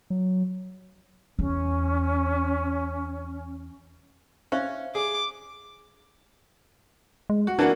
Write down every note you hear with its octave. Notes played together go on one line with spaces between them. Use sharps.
F#3
E2 C#4
C#4 C5 E5 F5
G#4 D6
G#3
F#4
E3 A#3 D4 F#4